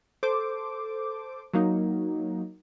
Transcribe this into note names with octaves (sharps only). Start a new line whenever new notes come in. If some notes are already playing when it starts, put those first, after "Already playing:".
A4 C5 D6
F#3 A#3 D#4